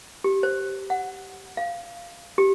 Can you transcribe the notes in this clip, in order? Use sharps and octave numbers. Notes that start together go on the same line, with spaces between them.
G4
C5
F#5
F5
G4